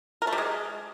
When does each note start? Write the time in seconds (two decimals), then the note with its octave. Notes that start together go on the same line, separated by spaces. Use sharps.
0.22 A#4
0.27 A3
0.33 G3
0.38 G#3